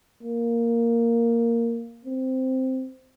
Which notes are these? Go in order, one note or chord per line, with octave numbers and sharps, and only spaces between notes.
A#3
C4